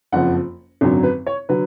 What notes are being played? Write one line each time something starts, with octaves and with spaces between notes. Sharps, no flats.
F#1 F2 F3 F#5
G#1 F#2 D3 F#3
B4
C#5
D3 F#3 B4